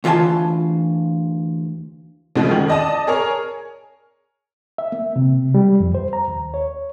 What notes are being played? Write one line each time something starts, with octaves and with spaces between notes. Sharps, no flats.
D2 E3 F4 D5 G#5 A5
D2 C#3 F3 G#3
D#3
D5 D#5 A5 D#6
G#4 A#4 C#5
E5
A#3
C3
G3
F2
C5
A#5
D#2
C#5